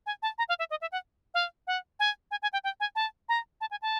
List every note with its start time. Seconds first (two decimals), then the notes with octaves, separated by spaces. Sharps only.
0.06 G#5
0.22 A5
0.38 A#5
0.49 F5
0.59 E5
0.70 D#5
0.81 E5
0.92 F#5
1.34 F5
1.67 F#5
1.99 G#5
2.31 G#5
2.42 G#5
2.53 G5
2.64 G5
2.80 G#5
2.95 A5
3.29 A#5
3.61 A5
3.71 G#5
3.82 A5